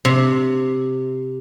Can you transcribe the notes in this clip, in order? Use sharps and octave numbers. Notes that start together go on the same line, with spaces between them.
C3